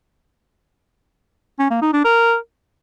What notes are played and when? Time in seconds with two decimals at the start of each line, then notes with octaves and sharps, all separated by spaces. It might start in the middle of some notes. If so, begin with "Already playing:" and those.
1.59 C#4
1.71 A#3
1.82 D#4
1.93 D4
2.05 A#4